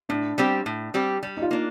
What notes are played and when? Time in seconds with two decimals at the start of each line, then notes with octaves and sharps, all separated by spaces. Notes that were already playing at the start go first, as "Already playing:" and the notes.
0.09 A2 D4
0.38 G3 C4 G4
0.66 A2
0.94 G3 C4 G4
1.23 G3
1.37 D#4
1.42 F4
1.51 A#3 D4